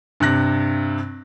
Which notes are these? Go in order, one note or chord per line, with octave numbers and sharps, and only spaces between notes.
G2 C3 F#6 A#6